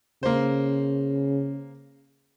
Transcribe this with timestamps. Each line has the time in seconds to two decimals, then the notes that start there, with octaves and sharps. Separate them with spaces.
0.23 C#3 A#3 C5